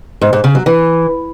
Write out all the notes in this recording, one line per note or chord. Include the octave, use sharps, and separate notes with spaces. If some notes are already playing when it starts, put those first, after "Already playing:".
G#2
G#2
C#3
F#3
E3